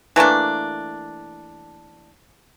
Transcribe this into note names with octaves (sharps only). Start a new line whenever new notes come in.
E3 A3 A#3 D4